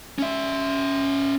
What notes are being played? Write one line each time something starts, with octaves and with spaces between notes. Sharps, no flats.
C#4 E5